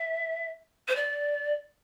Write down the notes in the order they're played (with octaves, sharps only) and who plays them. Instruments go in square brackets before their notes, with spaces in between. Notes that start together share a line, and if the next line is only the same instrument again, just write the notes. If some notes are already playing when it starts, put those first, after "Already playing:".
Already playing: [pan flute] E5
C5
D5